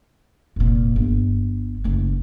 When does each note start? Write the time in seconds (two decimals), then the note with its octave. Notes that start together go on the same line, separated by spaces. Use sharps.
0.56 F1 A#2
0.96 G1 A3
1.84 F#1 A3